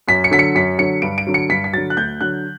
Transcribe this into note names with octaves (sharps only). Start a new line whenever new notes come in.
F#2 B6
C#7
D3 F#3 B6
C#7
F#2 B6
D3 F#3 C#7
G2 D7
D7
D3 F#3
C#7
G2 B6
B6
D3 F#3 A6
F#6
D2 G6
D3 F#3 F#6